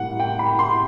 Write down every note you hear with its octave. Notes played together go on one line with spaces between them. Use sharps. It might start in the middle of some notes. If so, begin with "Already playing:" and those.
Already playing: A2 G3 F#5
G5
B5
C6